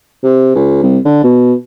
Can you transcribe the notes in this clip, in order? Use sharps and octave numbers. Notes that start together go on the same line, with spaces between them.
C3
C#2
C2
D3
B2